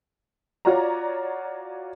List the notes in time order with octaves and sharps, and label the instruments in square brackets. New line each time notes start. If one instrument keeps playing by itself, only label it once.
[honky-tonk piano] F4 F#4 C#5 D5 A#5